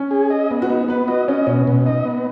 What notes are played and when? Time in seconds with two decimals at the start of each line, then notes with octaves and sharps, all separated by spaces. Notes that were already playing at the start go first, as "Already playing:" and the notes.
Already playing: C#4
0.11 G#4
0.30 D#5
0.51 B3
0.62 F#4
0.70 B3 D#4
0.88 B3 B4
1.08 F#4 D#5
1.28 C#4 D#5
1.47 B2 C#4
1.67 B2
1.86 D#4 D#5
2.05 B3